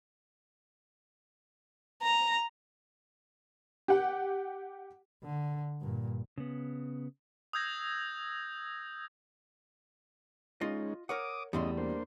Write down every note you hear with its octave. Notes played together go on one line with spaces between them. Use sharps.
A#5
G4 F#5
D3
G2 A#2
C#3 B3
D#6 E6 G6 G#6 A#6
G#3 C#4 D#4 F4 D#5
A#4 C#5 F#5 D6 D#6
E2 G3 A3 C#4 D#5 C6
A#3 D4 C5